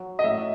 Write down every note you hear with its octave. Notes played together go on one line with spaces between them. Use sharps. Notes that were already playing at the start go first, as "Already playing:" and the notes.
Already playing: F#3
D#5
A2 F#3 A3 E5